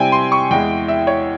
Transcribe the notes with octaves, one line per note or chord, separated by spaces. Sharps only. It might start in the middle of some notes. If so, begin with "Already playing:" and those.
Already playing: C3 G3 C4 E4 G5 G#5
C6
C#6
E2 E3 G#3 E4 G5
E5
C#5